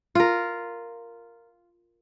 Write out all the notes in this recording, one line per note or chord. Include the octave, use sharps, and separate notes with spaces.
F4 A#4